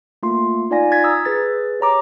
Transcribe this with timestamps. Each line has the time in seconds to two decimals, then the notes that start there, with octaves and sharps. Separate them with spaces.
0.23 A3 A#3 F4 C6
0.71 D#4 F4 D5 F5 G#5 A#6
0.92 G#6 A6 B6
1.03 A#5 D#6 E6 G#6 B6
1.25 G#4 B4 A6
1.80 G4 C#5 A#5 D6